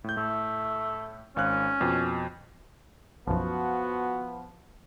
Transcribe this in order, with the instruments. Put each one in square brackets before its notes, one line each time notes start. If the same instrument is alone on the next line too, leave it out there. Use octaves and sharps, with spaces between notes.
[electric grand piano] A2 G6
[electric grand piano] A2 [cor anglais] A3
[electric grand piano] G#1 F5 F#6 [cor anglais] C#4
[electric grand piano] F2 B2
[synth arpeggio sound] B1 F#2 [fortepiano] F3 [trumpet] B3 [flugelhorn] F#4